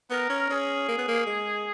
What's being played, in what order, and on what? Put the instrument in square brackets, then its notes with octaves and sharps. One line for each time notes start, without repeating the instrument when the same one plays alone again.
[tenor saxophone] B3 [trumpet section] A#4
[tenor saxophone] C#4
[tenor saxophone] C#4 [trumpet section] G#4
[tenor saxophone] A#3
B3
A#3
G#3